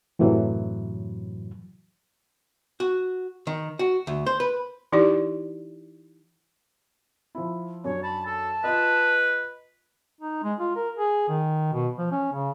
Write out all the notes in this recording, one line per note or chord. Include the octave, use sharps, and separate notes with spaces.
F#2 A2 C3 E3 F#3
F#4
D#3
F#4
D2
C5
B4
E3 D#4 E4 G4 D5
F3 E4
F#2 D4 C#5
A5 B5
A4 A5
F4 B4 D#5
D#4
G#3
F4
A#4
G#4
D#3
B2
F3
C#4
C#3